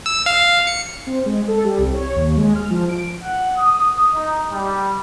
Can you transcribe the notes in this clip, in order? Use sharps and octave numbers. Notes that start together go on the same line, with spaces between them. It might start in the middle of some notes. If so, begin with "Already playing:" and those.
E6
F5
C#7
C4
G#3
A4
G3
C2
C#5
D#2
G#3
F6
F3
D7
F#5
D#6
D#4
G3